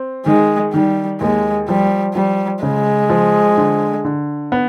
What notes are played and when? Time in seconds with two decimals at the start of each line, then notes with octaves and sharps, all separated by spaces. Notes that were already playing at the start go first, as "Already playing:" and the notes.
Already playing: C4
0.26 D#3 G#3
0.74 D#3 G3
1.21 D#2 G#3
1.69 F3 G3
2.15 F3 G3
2.63 C#3 G#3
3.10 F3
3.57 D3
4.05 D3
4.52 B3